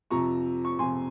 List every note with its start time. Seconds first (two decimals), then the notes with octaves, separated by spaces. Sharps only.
0.10 F2 C3 F3 A#5 C#6
0.65 C#6
0.79 F2 C3 F3 G#5 C6